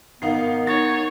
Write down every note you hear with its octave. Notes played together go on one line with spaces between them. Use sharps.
G#1 B3 D#4 A#4 F5 C7
D#4 C#5 A6